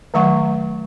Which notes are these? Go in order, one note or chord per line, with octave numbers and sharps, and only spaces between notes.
D#3 F#3 A3 F#5 C#6